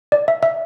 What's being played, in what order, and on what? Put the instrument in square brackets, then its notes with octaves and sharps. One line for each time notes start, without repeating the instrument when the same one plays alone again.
[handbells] D5
E5
E5